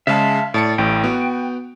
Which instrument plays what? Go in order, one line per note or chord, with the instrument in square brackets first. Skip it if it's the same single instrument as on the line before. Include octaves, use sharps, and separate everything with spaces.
[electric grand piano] C#3 G#3 [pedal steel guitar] E5 F5 A5
[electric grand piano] A2 A5 C#7 [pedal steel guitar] D5
[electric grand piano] A1 A2 [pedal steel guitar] G5
[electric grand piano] B3 F#4